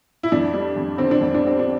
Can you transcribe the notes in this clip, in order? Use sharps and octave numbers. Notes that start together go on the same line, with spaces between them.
E4
F2 D4
G3
F2
D3 C4
D4
F2 C4
D4
G3 C4
D4